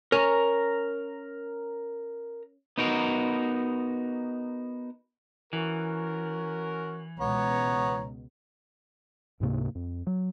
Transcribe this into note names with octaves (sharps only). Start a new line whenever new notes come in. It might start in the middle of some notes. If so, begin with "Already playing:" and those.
C#4 A#4 A#5
B3 D#4 F#4 A#4
E3 C#4 F#4 A#4
C#2 B2 B3 C#5 A#5
C#2 G#2 C3 A#3
F2
F#3